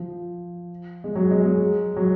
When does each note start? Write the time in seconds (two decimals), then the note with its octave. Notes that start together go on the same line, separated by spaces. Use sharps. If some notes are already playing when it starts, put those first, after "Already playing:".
Already playing: F3
1.04 G#3
1.15 F#3
1.31 G#3
1.45 G#3
1.96 F#3